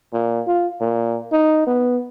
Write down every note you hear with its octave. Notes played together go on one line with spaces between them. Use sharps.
A#2
F4
A#2
D#4
B3